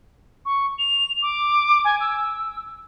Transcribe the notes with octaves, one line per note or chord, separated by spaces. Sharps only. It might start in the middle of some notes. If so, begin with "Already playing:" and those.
C#6
F7
D6
G#5
E6